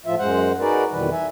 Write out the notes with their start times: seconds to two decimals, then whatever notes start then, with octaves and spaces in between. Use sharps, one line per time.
0.06 A2 F3 F4 E5
0.19 F#2 G#3 C5 F#5
0.60 D#4 F#4 G#4 A#4 B4 D5
0.92 F2 B2 D#3 E3 G3 B4
1.12 E5 G#5